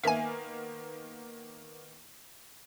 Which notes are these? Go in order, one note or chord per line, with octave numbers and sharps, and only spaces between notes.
D#3 A#3 B3 E5 G#5